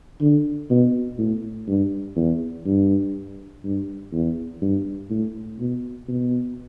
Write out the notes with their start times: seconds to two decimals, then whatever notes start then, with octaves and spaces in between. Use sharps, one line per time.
0.21 D3
0.70 B2
1.18 A2
1.68 G2
2.16 E2
2.66 G2
3.64 G2
4.13 E2
4.62 G2
5.10 A2
5.59 B2
6.08 B2